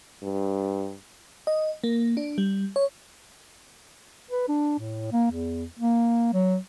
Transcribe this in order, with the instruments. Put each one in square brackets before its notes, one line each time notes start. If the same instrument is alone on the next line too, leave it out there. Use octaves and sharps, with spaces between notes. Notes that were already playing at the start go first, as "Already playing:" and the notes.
[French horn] G2
[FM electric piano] D#5
A#3
D4
G3
C#5
[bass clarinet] B4
D4
A2
A#3
E2
A#3
F#3